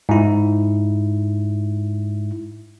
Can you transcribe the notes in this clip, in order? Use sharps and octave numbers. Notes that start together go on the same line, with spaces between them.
G#2 E4